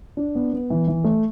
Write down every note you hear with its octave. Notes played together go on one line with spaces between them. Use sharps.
D4
B3
B3
E3
E3
A3